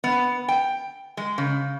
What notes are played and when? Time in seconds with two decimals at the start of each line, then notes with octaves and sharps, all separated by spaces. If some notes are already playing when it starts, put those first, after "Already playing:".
0.04 B3
0.48 G5
1.17 G#3
1.38 C#3